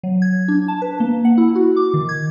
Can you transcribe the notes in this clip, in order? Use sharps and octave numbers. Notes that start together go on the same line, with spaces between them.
F#3
G#6
D4
A5
B4
A#3
F#5
E4
F#4
D6
D#3
G#6